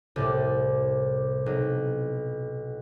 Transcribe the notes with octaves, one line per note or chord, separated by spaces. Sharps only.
C2 A2 D5
B1